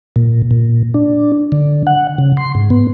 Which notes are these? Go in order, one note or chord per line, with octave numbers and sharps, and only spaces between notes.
A#2
A#2
D4
D3
F#5
C#3
C6
G#2
B3